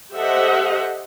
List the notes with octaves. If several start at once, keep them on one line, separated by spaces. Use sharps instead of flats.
G4 A4 C5 D#5 E5 F#5